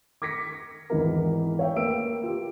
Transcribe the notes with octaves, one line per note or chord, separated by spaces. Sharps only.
D6 G#6 A#6 B6 C#7
G#1 E2 E3 D#4 E4 A#4
C#5 E5 G5
A#3 B4 E6 D7
F4 G4